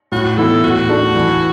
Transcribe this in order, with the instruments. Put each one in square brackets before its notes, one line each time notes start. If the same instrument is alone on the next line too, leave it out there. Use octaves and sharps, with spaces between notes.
[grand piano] A2 [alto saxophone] F#4
[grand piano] E3 B3 E4 [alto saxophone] A4
[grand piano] A2 [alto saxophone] F#4
[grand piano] A3 D4
E3